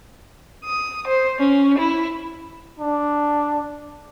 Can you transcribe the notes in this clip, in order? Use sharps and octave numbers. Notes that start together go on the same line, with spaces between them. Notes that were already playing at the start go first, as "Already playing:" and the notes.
D#6
C5
C#4
E4
D4